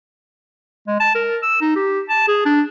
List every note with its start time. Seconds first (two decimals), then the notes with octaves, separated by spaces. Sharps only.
0.88 G#3
1.00 A5
1.15 A#4
1.43 E6
1.61 D#4
1.76 G4
2.09 A5
2.28 G#4
2.46 D4